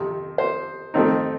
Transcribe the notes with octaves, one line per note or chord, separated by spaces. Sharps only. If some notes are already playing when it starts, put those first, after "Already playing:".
Already playing: F2 C3 D#3
C5
F2 D#3 A3 C4 D#4